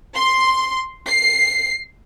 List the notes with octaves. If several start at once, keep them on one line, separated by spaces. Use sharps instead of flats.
C6
C7